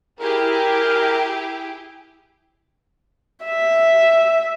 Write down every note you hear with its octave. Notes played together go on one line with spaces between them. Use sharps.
E4 G4 G#4 A#4
E5